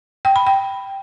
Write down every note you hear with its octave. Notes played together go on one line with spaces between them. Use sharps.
G5
B5
G5